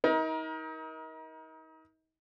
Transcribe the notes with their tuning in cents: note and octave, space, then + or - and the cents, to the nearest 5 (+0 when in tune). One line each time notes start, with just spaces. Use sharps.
D#4 +35 A#4 +25